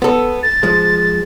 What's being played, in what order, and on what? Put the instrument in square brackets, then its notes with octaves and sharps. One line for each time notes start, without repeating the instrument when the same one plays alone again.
[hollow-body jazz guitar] B3 A4
[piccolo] A6
[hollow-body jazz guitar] F3 G#3